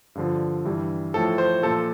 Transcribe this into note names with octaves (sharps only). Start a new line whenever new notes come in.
G2 D3 F3
G2 E3 G3
A2 F3 A4
C5
A#2 F3 A4